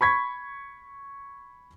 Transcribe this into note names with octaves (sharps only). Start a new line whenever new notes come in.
B5 C#6 G#6 B6